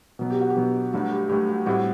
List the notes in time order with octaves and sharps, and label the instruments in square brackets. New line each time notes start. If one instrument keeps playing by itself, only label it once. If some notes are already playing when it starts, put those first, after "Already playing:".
[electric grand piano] B2 F#3 B3
[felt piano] G4
F#4
G4
[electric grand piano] B2 F#3 B3
[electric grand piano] G2 F#3 A3 [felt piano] F#4
[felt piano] G4
[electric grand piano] G2 F#3 A3 [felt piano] G4
[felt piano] F#4
[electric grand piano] A2 G3 C4 E4 G4 [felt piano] F#4